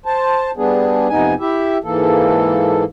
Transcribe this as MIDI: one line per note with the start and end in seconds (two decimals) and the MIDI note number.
0.06 0.51 72
0.06 0.51 81
0.57 1.08 55
0.57 1.08 59
0.57 1.08 62
0.57 1.08 68
1.09 1.34 41
1.09 1.34 48
1.09 1.34 59
1.09 1.34 63
1.09 1.34 80
1.40 1.78 64
1.40 1.78 67
1.40 1.78 76
1.84 2.84 44
1.84 2.84 52
1.84 2.84 58
1.84 2.84 69